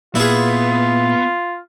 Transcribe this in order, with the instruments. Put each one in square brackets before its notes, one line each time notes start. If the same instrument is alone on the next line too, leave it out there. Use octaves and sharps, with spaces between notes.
[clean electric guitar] A#2 [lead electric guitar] B3 [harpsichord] E4 G#4 [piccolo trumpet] F4